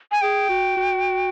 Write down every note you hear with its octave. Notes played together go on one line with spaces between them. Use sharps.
G#5
G#4 G5
F#4
F#4